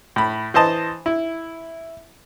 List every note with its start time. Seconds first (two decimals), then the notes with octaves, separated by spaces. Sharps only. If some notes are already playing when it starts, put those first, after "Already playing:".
0.16 A2 B5
0.54 E3 C5 D#5 A5
1.06 E4